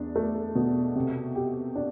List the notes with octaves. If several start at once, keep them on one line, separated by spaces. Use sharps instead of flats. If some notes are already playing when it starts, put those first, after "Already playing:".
Already playing: E2 D4
A3
B2
C3
G4
D4